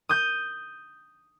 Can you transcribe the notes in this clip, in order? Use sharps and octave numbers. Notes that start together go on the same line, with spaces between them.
D#6 G6